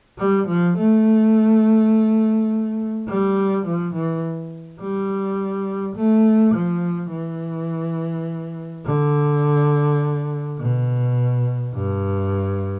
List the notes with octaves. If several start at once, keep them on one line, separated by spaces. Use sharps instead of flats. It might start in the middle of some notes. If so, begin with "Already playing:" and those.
G3
F3
A3
G3
F3
E3
G3
A3
F3
E3
D3
B2
G2